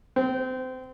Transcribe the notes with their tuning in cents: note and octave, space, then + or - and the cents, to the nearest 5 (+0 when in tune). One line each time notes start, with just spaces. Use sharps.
C4 -25